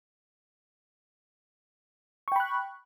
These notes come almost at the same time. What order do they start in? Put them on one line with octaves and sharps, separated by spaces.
C#6 G5 B5 F#6